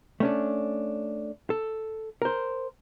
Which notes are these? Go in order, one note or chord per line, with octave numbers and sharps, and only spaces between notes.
A3 C#4 D4
A4
A#4 C5